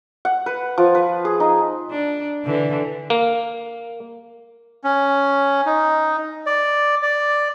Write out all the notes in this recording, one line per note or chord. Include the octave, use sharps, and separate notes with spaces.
F#5
B4
F3
B4
G#4
D#4
D4
D3 E3
A#3
C#4
D#4
D5
D5